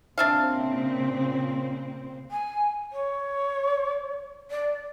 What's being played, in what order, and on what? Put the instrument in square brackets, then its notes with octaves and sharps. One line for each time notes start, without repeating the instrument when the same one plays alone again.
[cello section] A#2 C#3 C4 [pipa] D4 E5 F5
[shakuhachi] G#5
C#5
D5